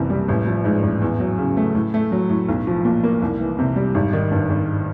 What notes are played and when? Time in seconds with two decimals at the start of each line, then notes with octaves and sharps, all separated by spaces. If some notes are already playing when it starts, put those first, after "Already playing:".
Already playing: F#1 C2 C3 E3
0.10 G3
0.29 A1
0.47 F3
0.65 G#2
0.83 A1
1.01 E2
1.20 F#3
1.38 C#3
1.57 A3
1.75 A2
1.94 A3
2.12 F#3
2.29 A2
2.49 B1
2.67 F3
2.85 A#2
3.03 A#3
3.22 C2
3.40 E3
3.59 C3
3.76 G3
3.94 G#1
4.13 D#3
4.32 G2
4.50 G#1